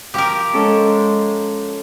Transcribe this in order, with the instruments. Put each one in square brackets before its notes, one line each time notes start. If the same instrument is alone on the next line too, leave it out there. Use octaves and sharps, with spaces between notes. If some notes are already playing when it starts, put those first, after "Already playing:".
[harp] F3 D6 [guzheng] G4 A#4
[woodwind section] G#3 [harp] C#4 A4